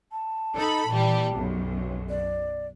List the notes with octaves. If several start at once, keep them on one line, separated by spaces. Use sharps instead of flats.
A5
D#4 A4 B5
A#2 E3 G3
B1 F#2
D5